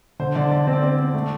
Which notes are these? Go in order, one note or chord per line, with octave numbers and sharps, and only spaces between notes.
D3 C5
D3 D5
D3 D5
C4
D5
C4
C4
A3